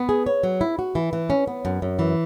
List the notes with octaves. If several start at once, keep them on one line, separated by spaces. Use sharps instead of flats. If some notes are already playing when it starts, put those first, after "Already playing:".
Already playing: B3
G#4
C#5
F#3
E4
F#4
E3
E3
C#4
B3
F#2
F#2
E3